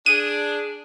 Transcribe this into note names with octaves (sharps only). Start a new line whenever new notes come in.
D4 G#4 D#7